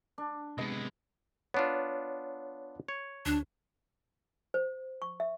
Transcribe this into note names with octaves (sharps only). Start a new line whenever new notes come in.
D4
C3 G#3 B3 D#5
B3 D4 F4 C#5
C#5
D2 D4
C5
C#6
E5